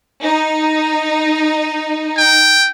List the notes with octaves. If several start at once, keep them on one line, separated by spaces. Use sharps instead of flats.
D#4
G5